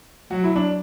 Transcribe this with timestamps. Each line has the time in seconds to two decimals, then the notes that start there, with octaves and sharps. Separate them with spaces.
0.31 F#3 F#4
0.44 E4
0.56 D4